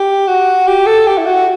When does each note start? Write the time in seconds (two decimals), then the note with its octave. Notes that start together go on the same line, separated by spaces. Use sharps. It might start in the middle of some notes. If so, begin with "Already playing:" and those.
Already playing: G4
0.27 F#4
0.67 G4
0.86 A4
1.07 G4
1.18 E4
1.26 F#4